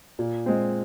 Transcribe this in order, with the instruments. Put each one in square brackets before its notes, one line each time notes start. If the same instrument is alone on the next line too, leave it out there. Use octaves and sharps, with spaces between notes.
[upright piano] A#2
G#3 C4